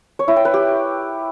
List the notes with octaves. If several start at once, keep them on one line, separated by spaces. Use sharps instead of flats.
C#5
E4
G5
B4
G4